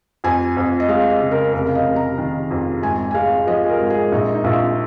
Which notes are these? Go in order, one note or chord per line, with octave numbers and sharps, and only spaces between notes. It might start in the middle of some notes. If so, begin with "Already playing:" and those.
F2 G#5
F2
D#5
G#3 F5
D#5
C#3
A#4
F1 A#4
F5
D#5
F1
A#5
D#3
F2
G#1 G#5
G#5
G#3 F5
F3 D#5
G#4
A#4
G#2
G#4
A#1 D#4
D#4
A#1 F4